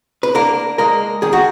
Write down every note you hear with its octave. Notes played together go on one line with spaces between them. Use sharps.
B4
A#3 D4 A#4
G#3 A#3 A#4
D#3 G#4
F#4